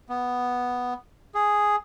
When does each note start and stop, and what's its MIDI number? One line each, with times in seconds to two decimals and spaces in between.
0.09 0.94 59
1.35 1.76 68